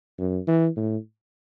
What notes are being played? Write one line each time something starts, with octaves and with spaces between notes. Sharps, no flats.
F#2
E3
A2